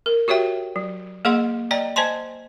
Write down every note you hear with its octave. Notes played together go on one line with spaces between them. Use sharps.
A#4
F#4 G4 C#5 E5 G5
F#3
A#3 G#4 D#5 F#5 C6
D5 D#5 G5 A#5
C5 D#5 G#5 A5 C6